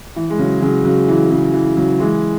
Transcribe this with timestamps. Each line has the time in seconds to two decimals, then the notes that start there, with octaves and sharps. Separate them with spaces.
0.16 E3
0.30 G#3
0.39 C#3 F#3
0.62 C#3 F#3
0.85 C#3 F#3
1.08 E3
1.31 C#3
1.54 E3
1.77 C#3 F#3
2.00 E3 G#3